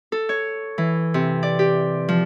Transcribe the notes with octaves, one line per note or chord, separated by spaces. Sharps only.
A4
C#5
E3
C3
D5
G4
F3